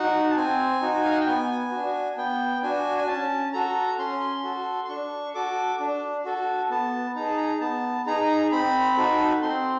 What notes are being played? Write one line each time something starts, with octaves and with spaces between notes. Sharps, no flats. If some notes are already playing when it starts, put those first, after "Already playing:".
Already playing: D#4 F#4 F#5
A5
C4 G#5
D#4 F#4
F5
F#5
G5
B3 G#5
D4 F#4
B3 G5
D4 F#4 G#5
G#5
C#4 A5
F#4 A4 A#5
C#4 C6
F#4 A4
C6
D4 C#6
F#4 A4 D6
D4
F#4 A4
B3 A5
D#4 G#4 A#5
A5
A#5
B3 A5
D#4 G#4 A#5
C4 B5
D#4 F#4 A4
C4 C6